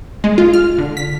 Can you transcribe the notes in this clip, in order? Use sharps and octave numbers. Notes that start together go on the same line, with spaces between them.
G#3
F4
F6
D3
B6